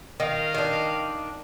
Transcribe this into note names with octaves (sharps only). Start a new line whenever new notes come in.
D#3 D#5 F5
D#3 D4